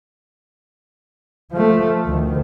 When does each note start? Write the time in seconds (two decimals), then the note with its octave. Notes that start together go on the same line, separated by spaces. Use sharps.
1.52 F3 A3
2.06 D2 D#3